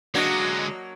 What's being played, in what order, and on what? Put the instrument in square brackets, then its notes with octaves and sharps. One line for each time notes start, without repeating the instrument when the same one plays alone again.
[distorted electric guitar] D3 G#3 [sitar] F#3 A#3 D4 [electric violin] F#4 D#5